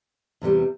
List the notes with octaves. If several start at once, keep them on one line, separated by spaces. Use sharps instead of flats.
E2 C3 E3 G3